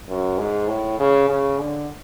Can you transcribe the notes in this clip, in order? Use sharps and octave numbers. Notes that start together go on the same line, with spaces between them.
F#2
G#2
A2
C#3
C#3
D3